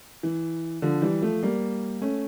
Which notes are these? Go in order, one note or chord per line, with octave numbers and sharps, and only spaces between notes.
E3
D3 F3
E3 G3
F3 A3
G3 A#3
A3 C#4